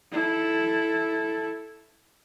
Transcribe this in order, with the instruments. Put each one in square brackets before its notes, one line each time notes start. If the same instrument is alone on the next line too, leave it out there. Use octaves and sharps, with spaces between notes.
[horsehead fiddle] E4 A4